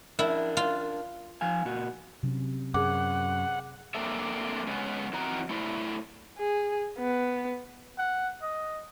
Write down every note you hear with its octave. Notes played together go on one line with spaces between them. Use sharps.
D4 E4 A#4
F4
F3 F5 G#5
A#2 F#4
C3 F#3 C#4
F#2 G#4 F#5 D6
A3 A#3 C4 D4 A4 E5
G#3 B3 C#4
E3 C4 D#4 F#4 A#4 A#5
A3 E4 C5 D5
G#4
B3
F#5
D#5